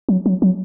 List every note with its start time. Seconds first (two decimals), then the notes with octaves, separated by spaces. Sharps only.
0.09 F#3
0.26 F#3
0.42 F#3